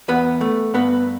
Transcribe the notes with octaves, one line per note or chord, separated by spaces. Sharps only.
E2 B3 B4
A3
G2 B3 B4